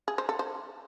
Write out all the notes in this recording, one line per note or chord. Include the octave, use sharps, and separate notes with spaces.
G#4
C5
A4
C5